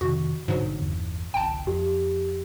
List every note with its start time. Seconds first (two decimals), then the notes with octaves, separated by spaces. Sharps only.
0.01 F2 C3 D#3 F#4
0.48 A1 G#2 B2 D3 F#3 D4
0.79 G1 E2
1.34 G#1 C#2 G5 A5
1.67 F2 G4